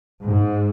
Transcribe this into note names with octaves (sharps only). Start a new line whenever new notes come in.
G#2